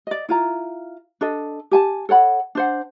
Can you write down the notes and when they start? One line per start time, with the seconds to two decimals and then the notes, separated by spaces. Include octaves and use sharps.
0.07 D5 D#5
0.29 E4 F4 A#5
1.21 D4 A4 D#5
1.71 G4 G#5 A5
2.09 A4 C#5 F#5 B5
2.55 D4 C5 F#5